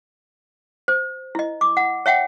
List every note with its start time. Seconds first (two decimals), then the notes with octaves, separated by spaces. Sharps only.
0.88 C5
1.35 E4 D#5
1.61 D6
1.77 F#5
2.06 C#5 E5 F#5 G5